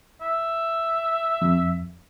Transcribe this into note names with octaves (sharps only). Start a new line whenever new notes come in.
E5
F2